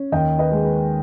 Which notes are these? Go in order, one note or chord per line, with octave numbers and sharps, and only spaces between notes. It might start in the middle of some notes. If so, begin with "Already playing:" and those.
Already playing: C#4
D#2 D#5 G5
B4 D#5
G#3
B4